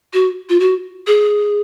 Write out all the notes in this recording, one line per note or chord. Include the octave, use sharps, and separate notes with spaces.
F#4
F4
F#4
G#4